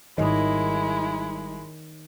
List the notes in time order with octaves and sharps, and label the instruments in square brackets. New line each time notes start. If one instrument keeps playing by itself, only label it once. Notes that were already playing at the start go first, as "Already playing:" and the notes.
[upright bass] G#1 G3 [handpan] D#3 C#5 D#5 [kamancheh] G#3 E4